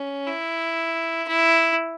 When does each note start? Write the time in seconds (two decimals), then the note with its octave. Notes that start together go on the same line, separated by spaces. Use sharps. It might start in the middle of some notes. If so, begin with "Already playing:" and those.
Already playing: C#4
0.27 E4
1.28 E4